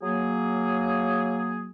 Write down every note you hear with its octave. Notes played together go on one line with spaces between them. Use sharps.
F#3 A#3 G#4